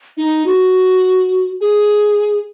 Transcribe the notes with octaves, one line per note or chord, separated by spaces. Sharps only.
D#4
F#4
G#4